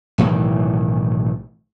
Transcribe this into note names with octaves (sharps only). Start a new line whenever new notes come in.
B1 A2 D#3 E3